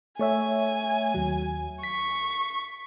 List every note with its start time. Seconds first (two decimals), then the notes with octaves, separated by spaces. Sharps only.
0.19 A3 C#5 E5 G#5
1.14 D#2 F#3
1.83 C#6 B6